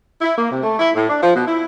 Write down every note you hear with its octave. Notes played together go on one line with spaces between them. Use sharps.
E4
A#3
C3
A3
E4
A2
D4
F3
B2
E4